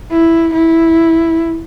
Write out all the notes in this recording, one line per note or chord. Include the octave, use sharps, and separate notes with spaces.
E4
E4